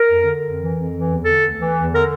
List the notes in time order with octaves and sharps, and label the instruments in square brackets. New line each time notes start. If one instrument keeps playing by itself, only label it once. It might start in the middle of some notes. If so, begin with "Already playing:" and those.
Already playing: [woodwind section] A#4
F2
D3
F2
E3
F2
E3
E2
D3 A4
D2
E3
E2
D3 A#4